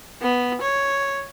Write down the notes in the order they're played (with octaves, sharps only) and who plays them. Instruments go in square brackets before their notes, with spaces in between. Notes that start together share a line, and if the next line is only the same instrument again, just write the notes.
[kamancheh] B3
C#5